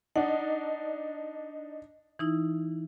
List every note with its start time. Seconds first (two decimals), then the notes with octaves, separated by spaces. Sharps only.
0.16 D4 D#4 F#5
2.19 E3 D#4 E4